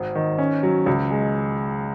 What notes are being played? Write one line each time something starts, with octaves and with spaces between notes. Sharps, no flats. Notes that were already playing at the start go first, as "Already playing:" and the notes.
Already playing: G#1
D#3
C#4
F#3
C#2
G#3